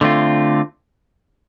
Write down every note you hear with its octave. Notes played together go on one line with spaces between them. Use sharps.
D3 A3 C4 F4